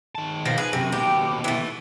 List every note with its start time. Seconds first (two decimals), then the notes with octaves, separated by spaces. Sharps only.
0.15 D#3 A5
0.45 B2 F3 A#3
0.58 G#4 B4
0.73 F#2 C3
0.92 D#2 B2 G4
1.44 E3 A3